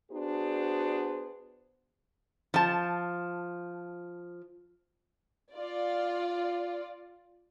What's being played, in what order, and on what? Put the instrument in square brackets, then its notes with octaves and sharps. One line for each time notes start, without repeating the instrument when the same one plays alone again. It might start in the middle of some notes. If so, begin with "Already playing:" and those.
[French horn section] B3 D4 F#4 G#4 C5
[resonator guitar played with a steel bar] F3 A5
[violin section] F4 D5